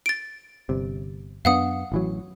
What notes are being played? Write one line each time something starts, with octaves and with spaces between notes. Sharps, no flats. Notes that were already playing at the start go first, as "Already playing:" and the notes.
A6 D7
G1 C3
F#2 B3 D4 F5 F#5 D#6
A1 E3 F#3